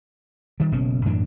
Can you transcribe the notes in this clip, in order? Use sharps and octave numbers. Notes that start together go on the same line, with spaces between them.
D#3 G3
F#1 B2 A#3 C#4
F#2 A2 E3 D4